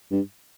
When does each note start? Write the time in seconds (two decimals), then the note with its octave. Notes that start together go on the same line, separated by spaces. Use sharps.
0.11 G2